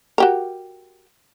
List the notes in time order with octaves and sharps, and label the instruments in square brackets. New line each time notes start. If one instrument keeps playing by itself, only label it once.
[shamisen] F#4 G4 A#4